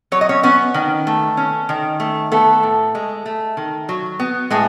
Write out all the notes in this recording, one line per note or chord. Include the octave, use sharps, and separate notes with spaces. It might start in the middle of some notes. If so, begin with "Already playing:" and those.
F#3 C#5
D#5
C#4 C#5
B3 C#4 B4
D#3
A3
C#4
D#3
A3
A3 B3 A4
A2
G#3
A3
D#3
F#3
B3
A2 G#3 G#4